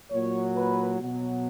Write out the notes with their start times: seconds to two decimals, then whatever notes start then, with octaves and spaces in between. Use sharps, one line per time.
0.11 A#2 F#3 C#5
0.55 B4
0.98 B2 F#3